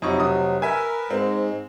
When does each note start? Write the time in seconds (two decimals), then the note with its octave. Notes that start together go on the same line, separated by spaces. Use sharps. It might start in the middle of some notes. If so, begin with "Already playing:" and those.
0.02 F2 C3 F#3 D#4 C#6
0.19 F1 D#6
0.62 A#4 B4 E5 G#5
1.11 G#2 G#3 C4